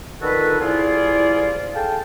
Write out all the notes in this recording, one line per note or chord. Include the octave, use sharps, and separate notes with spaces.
D3 D#3 F4 F#4 A4 B4
C2 F2 E4 F4 G#4 D5
G#4 A4 F5 G5 A5